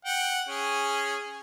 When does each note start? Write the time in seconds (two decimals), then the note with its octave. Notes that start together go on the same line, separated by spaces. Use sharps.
0.05 F#5 G5
0.49 C#4 G#4